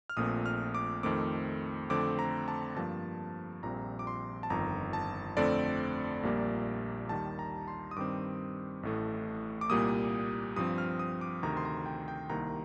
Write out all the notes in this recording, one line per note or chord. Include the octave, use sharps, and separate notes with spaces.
F6
A#1 A#2 A3 C4 D#6
F6
D6
F2 D#3 A3 C4 D6
F2 D3 A3 C4 D6
A#5
A5
G2 F3 A#3 A5
A#1 A#2 G3 C4 A#5
D6
C6
A5
G1 F2 D#3 A#5
A5
F2 D3 A3 C4 D5
A#1 A#2 G3 A#3
D#2 D#3 G3 A5
A#5
C6
D#6
G2 D#3 G3 C4 D6
A1 A2 A3
D6
C2 A#2 G3 A#3 D#6
G2 F3 C4 D#6
F6
D#6
D6
D2 C3 D#3 A#5
C6
A#5
G5
G5
C2 C3 D#3 A#3 A#5